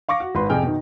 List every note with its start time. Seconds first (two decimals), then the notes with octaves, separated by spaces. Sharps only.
0.09 F5 C#6 D6 A#6
0.20 F#4
0.35 G#1 B4 C6
0.49 F2 C3 G#4 G5 F6
0.63 B2 D#3